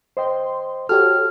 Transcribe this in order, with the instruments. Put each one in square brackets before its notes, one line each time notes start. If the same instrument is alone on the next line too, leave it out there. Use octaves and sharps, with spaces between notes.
[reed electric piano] C5 D#5 G5 [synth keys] C6
[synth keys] F#4 C#5 [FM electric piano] G4 A4 [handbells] F6